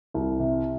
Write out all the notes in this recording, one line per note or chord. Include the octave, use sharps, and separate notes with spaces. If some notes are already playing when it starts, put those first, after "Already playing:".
C2
C3